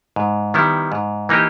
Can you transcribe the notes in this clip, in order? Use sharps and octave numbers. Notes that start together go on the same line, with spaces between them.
G#2
D#3 G3 B3 E4
G#2
E3 A#3 D#4 G4